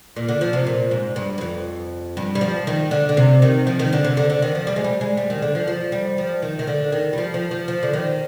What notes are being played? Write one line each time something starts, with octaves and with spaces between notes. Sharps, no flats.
A#2
D3
F3
C3
A#2
G#2
G2
G2
F2
G2
G3
F3
D#3
D3
D3
C3
D#3
F3
D#3
D3
C3
D3
D3
D#3
F3
G3
G#3
G3
G#3
G3
D#3
D3
F3
F3
G3
F3
D#3
D#3
D3
D#3
G3
F3
F3
F3
F3
D3
D#3